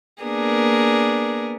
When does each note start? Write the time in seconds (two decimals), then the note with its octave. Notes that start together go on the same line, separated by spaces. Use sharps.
0.22 A#3 B3 D4 G#4 A#4